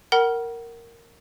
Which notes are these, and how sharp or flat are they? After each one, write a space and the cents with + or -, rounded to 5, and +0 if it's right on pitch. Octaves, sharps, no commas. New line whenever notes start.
A#4 -5 F#5 +25 B5 -45